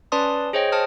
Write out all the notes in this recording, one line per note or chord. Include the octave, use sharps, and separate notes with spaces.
C#4 B4 D5 A5 C6 D#6
G#4 C5 C#5 D#5 G5
C5 A5 D#6 F6